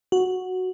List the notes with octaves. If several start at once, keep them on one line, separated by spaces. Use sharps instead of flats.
F#4